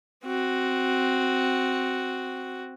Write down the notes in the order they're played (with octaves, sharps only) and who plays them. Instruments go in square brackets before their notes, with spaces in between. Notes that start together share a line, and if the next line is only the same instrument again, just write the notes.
[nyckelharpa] C4 F#4